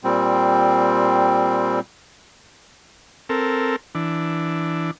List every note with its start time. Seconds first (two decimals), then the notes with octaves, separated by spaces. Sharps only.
0.04 A#2 G3 C4
3.29 C4 A4 A#4
3.95 E3 D4